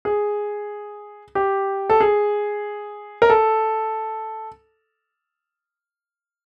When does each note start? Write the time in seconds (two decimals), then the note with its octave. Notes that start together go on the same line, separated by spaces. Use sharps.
0.05 G#4
1.35 G4
1.90 A4
2.00 G#4
3.22 A#4
3.30 A4